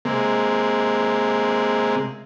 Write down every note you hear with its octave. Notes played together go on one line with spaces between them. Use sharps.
C3 G#3 A#3